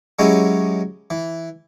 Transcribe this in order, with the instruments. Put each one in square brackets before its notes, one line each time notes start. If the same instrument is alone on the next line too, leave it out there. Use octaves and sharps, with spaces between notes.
[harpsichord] F#3 G#3 C#4 E4 G4
E3